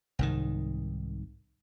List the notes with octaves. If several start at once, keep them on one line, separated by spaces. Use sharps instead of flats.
C2 G#2 D#3